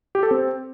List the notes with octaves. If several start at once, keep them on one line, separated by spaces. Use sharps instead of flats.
G4
A4
C4